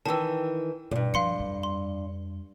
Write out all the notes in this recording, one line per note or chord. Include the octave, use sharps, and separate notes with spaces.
D#3 E3 A5 E6
E2 G2 B2
F3 D4 F5 C6 C#7
F2 G3
C6